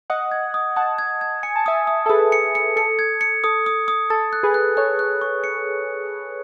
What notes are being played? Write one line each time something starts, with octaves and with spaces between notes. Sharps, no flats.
D#5 F#5 D#6
G#6
D#6
F#5 A5 D#6
G#6
G#6
G#5 C#7
A5
E5 G#5 D#6
D#6
A4
G#4 B4 D#6
C#7
C#7
A4 C#7
G#6
C#7
A4 D#6
D#6
D#6
A4 A6
F#6
G#4 B4
F#6
A4 C#5 F#6
F#6
C#6
C#7